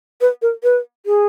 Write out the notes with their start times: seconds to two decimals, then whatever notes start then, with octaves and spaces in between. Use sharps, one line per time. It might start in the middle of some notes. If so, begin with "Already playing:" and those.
0.21 B4
0.42 A#4
0.63 B4
1.06 G#4